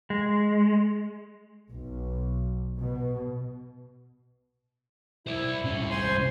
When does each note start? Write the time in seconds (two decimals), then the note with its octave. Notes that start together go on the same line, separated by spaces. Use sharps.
0.10 G#3
1.71 B1
2.79 B2
5.27 E4 C5 D5
5.64 C2 C#4
5.90 C5 G#5 C6